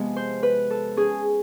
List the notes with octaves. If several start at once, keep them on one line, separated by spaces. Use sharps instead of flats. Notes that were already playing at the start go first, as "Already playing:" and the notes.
Already playing: C3 F3 G#3 B3
C5
B4
A4
C#4 G#4